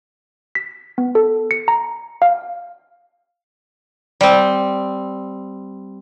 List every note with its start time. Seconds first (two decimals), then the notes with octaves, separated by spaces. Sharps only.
0.55 B6
0.98 B3
1.15 A4
1.51 C#7
1.68 A#5
2.22 F5
4.21 G3 C4